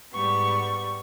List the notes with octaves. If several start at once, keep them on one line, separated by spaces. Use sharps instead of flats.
G#2 G3 B3 C#6